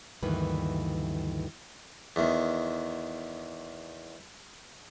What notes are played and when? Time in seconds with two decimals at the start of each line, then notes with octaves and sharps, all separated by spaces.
0.23 D2 G2 D#3 E3 A#3 B4
2.16 E2 D#3